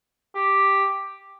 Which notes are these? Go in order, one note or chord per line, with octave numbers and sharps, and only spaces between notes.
G4